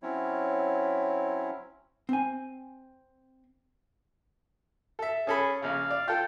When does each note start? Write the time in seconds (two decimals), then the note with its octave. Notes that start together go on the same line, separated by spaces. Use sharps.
0.03 F#3 C4 C#4 E4 C#5
2.09 C4 G#5
4.99 A4 E5
5.27 C#4 G#4 A4 B5
5.62 A#1 C#3 F5
5.90 D5
6.08 F4 A4 G5